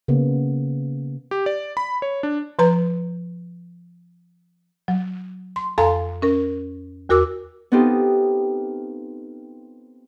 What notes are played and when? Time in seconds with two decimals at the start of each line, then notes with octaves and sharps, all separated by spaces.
0.08 C#3 A#3 B3
1.31 G4
1.46 D5
1.77 B5
2.02 C#5
2.23 D4
2.59 F3 B4 A#5
4.88 F#3
5.56 C6
5.78 F2 A4 F5 G#5 A#5 C6
6.22 C#4 A#4
7.09 E2 F#4 A#4 D6 E6
7.72 B3 C4 D#4 F4 G4 A4